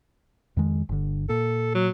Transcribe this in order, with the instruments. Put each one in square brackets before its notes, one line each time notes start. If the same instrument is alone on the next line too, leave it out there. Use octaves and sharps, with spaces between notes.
[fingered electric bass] F2 D#3 G#3
G1 D3
[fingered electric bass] A#2 [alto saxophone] A4
[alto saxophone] F#3